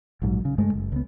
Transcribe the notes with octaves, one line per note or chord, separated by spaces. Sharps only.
A#1 G#2 F3 F#3
C#3
G2 G#3 A3
F#1
C#2 B3